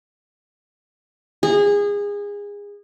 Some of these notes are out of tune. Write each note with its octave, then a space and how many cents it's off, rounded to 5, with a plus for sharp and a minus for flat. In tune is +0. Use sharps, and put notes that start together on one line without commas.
G#4 -25